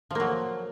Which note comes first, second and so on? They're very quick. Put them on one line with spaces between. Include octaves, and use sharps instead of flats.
F3 A#3 F#3